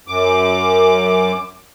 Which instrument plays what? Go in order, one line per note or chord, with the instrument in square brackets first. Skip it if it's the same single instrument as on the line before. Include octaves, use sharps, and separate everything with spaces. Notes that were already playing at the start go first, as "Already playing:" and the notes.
[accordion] F#2 D6